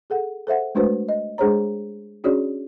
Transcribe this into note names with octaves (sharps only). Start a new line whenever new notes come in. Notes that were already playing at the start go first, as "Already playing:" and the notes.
G#4 A4 F#5
A4 C5 E5 F#5
G#3 A3 D4 F#4 B4 C5
D#5
G#3 D4 G#4 C5 C#5 A#5
C#4 D4 F#4 G#4 C#5 D5